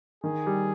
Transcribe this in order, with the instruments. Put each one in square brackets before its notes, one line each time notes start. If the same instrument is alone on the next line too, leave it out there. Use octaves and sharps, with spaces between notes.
[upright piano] D#3 [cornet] G#4
[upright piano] G3